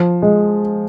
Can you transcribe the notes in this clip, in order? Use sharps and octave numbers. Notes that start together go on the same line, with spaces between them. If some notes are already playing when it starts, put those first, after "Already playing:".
Already playing: F3
G#3